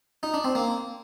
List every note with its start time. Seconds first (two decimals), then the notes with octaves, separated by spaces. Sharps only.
0.23 D#4
0.34 D4
0.44 C4
0.55 A#3